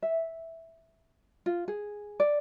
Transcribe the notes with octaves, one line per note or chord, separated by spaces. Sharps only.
E5
F4
G#4
D5